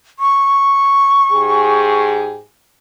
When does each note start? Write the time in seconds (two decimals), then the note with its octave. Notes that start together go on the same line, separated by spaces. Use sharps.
0.19 C#6
1.31 G#2 G4 G#4